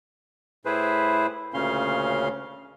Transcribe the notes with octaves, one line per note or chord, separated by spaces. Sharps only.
A2 E4 G#4 B4 C5
D2 A#2 C#3 C#4 F5 C6